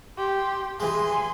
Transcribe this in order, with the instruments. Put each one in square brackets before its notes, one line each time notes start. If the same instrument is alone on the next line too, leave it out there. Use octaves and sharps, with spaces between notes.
[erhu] G4 [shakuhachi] C6
[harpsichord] E3 G#3 [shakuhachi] G#5 [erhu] C6